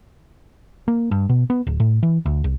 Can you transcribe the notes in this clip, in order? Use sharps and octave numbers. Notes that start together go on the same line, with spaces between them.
A#3
G2
B2
B3
D1
A2
E3
D2
C2